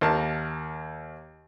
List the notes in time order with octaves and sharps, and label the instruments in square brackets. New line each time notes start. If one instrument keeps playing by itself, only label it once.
[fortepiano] D#2 A#4 A5